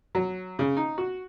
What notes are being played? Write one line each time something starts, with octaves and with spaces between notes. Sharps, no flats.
F#3
C#3
D#4
F#4